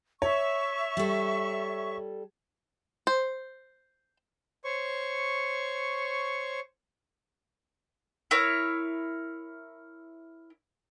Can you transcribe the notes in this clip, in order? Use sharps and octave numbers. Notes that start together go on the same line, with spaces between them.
C#5 E5 C#6
G3 A4
C5
C5 C#5 C#6
E4 A#4 C#5